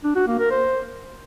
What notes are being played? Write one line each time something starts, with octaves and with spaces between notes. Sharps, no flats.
D4
F#4
A#3
A#4
C5